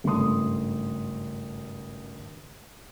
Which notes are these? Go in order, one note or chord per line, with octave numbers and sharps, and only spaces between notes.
G#1 G2 C#3 A3 C6 D#6